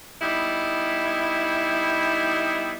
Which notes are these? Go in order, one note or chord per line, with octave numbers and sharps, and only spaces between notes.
G3 B3 D#4 E4